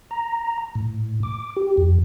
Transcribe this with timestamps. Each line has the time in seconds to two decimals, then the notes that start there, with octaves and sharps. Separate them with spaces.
0.11 A#5
0.75 A2
1.23 D6
1.56 G4
1.77 F2